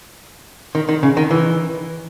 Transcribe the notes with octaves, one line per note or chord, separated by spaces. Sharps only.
D#3
D#3
C#3
D#3
E3